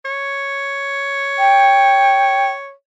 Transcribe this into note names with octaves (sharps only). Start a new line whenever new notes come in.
C#5
G5